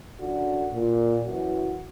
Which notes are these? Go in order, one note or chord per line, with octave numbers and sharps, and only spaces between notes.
F#2 D3 F#4
A#2
F#2 E3 F#4